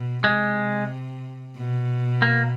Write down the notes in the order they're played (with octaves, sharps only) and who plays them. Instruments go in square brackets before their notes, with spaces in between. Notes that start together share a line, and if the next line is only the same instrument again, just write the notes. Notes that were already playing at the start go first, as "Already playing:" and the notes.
Already playing: [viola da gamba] B2
[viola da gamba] C3 [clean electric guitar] G#3
[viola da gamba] B2
[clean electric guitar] A#3